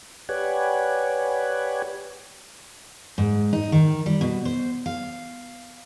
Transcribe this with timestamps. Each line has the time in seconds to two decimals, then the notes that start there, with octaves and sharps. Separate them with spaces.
0.29 G4 B4 C#5 D5 F#5 G#5
3.18 G#2
3.53 D#4
3.72 D#3
4.06 G3
4.21 B2
4.45 C5
4.86 F5